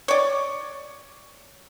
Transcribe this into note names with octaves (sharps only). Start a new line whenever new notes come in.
C#5 D5